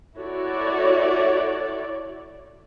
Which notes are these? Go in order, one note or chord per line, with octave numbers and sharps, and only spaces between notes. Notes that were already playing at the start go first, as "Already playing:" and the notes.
E4 F#4 A4 C#5 D5